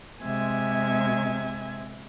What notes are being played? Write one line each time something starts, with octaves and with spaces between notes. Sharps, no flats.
C3 G#3 E5 G#5 G#6